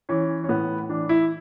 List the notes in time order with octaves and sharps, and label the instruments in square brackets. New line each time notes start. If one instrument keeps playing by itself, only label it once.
[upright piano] E3 C#4
C#4
A2 B3
E3 D4
E4